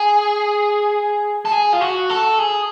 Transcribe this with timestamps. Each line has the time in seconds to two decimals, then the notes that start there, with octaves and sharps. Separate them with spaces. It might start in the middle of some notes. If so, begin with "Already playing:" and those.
Already playing: G#4
1.46 A4
1.52 G#4
1.73 F4
1.81 F#4
2.10 A4
2.39 G#4